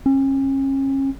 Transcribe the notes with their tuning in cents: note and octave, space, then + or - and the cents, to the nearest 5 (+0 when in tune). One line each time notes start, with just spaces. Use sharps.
C#4 -35